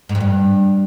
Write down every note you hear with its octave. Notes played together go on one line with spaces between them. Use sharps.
G#2
F2
G2